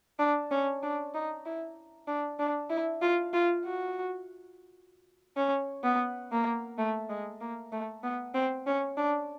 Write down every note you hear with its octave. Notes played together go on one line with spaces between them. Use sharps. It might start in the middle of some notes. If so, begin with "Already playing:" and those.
D4
C#4
D4
D#4
E4
D4
D4
E4
F4
F4
F#4
C#4
B3
A#3
A3
G#3
A#3
A3
B3
C4
C#4
D4